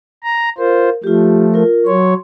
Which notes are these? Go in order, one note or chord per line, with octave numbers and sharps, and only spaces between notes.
A#5
F4 A#4 C5
F3 A3 F4 G4
F4 A#4
F#3 C#5 C6